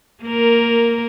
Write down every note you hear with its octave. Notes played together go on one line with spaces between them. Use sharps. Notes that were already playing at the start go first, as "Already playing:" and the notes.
A#3 A#4